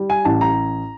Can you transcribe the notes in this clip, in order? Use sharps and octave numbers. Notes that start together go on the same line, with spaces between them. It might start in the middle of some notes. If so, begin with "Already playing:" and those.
Already playing: G3
G#5
A1 A5
A#5